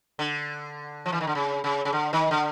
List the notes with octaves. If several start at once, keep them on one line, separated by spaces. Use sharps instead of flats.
D3
F3
E3
D#3
D3
C#3
C#3
C#3
D3
D#3
D3